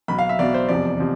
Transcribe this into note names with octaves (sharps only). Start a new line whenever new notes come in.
B1 B2 B5
F5
E5
B1 B2 D5
C5
F1 E2 C3 F3 D5
C3 F3